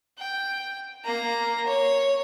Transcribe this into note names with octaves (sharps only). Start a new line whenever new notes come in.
G5
A#3 A#5
C#5